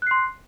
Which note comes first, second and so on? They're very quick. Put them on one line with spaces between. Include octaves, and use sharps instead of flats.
F#6 C7 C6